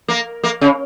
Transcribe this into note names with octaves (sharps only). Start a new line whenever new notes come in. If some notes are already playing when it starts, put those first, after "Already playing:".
A#3
A#3
C#3